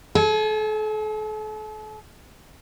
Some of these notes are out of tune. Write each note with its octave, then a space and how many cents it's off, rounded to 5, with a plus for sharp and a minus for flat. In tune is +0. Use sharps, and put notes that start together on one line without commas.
A4 -40 G#5 +5